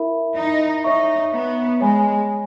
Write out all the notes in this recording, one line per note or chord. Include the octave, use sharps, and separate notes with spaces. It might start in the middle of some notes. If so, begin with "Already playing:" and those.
Already playing: E4 A#4 E5 B5
D#4
D#4 C#5 E5 A#5 C#6
B3
G#3 C#5 G#5 B5